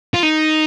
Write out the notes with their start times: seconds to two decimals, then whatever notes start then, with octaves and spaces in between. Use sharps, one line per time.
0.14 F4
0.23 D#4